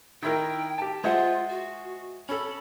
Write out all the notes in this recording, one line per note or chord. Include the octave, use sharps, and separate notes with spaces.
D#3 E4 A#4 G5
G4 A5
G#3 F4 C5 E5 F#5
F#4
C#4 A4 B5